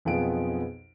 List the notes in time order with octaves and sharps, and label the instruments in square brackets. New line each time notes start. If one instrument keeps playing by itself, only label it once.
[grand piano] B1 F2 B3 F4 G#4 D7